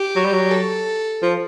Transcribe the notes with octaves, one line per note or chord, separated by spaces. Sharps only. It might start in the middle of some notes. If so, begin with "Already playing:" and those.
Already playing: G4
F#3
G3
F#3
A4
F3